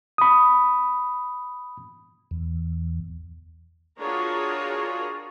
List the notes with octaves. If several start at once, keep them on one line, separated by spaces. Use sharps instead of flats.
B5 D#6
E2
D4 F4 F#4 G#4 A#4 C#5